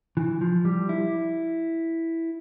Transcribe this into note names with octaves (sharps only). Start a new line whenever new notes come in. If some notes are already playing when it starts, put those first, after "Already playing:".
E3
F3
G3
E4